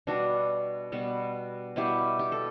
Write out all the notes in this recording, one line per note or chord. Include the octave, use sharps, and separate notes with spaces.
B2 G3 B3 D4 F#4
B2 G3 B3
B2 G3 B3 E4 G4
G4
A4